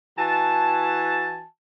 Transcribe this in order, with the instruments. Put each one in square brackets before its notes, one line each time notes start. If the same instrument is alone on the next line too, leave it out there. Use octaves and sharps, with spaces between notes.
[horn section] E3 F#4 G#5 A5